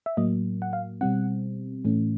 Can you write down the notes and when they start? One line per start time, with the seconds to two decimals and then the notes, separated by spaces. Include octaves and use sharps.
0.06 E5
0.17 A2 F#3 A#3 D#5
0.62 F#5
0.73 F5
1.01 B2 G3 C4 F#5
1.85 A2 E3 A3 C#4